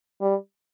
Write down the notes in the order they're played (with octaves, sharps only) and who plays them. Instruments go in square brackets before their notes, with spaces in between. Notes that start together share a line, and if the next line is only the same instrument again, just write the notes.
[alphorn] G3